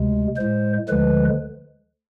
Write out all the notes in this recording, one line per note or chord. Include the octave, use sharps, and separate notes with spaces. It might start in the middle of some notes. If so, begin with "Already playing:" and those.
Already playing: D2 C3 G#3
A2 G#3 C5
D2 D3 F3 G#3 B4